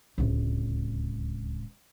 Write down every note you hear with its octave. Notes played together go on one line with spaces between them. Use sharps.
D1 C#2